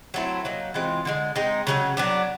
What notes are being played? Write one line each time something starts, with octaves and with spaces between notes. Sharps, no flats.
F#3 A3 C4 E4
F#3 A#3 D#4
E3 G#3 C4 F4
D3 F3 G#3
G#3 C4 D#4
C#3 F#3 A3 C#4
F#3 B3 D4